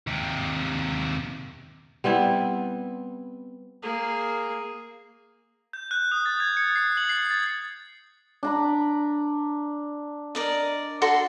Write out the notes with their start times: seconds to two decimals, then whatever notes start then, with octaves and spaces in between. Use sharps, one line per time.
0.07 D#2 C3
2.04 G3 B3 C4 E4
3.82 A#3 G#4
5.73 G6
5.91 F#6
6.12 D#6
6.26 A6
6.40 G#6
6.57 C#7
6.76 C7
6.97 F#7
7.09 C7
7.30 A6
8.43 D4 A#5 B5
10.35 A#4 D5 D#5
11.02 F#4 A4 C6